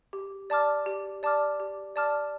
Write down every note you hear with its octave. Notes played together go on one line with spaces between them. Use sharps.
G4
D5 A5 D6 F6
G4
D5 A5 D6 F6
G4
D5 A5 D6 F6